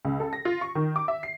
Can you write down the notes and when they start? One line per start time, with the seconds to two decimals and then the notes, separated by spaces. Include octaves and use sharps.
0.05 C#2
0.20 A4
0.33 A#6
0.45 F4
0.61 C#6
0.75 D#3
0.96 D6
1.08 E5
1.23 C7